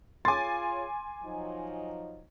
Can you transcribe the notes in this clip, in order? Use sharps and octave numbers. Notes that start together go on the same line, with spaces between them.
F4 G#4 C#5 G#5 C6 D6 A6
F3 F#3 D#4